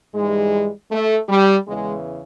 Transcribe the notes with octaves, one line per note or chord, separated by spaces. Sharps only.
G#2 E3 G3 G#3
A3
G3
E2 C#3 E3 G#3